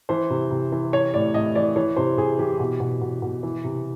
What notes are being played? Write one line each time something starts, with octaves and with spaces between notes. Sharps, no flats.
E3 C5
C3
C3
E3
E3 C#5
A2 D5
A2 D#5
E3 D5
E3 C#5
C3 C5
C3 G#4
E3 G4
B2
B2
B2
B2
E3
C3